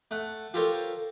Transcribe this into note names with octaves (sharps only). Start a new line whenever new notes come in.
A3 F#5
F4 G4 A4 A#4 C5 C#5